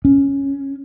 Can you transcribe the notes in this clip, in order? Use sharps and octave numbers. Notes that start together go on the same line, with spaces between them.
C#4